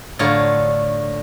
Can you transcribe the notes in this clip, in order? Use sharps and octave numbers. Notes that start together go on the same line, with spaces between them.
A2 D3 F4 C#5 A#5